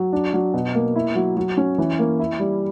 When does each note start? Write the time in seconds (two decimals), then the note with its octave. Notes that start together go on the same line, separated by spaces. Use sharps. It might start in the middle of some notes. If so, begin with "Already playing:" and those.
Already playing: F#3
0.13 D4
0.33 F#3
0.54 B2
0.75 A#3
0.96 E4
1.15 F#3
1.37 F#3
1.57 C#4
1.78 E3
1.99 A#3
2.19 E4
2.40 G3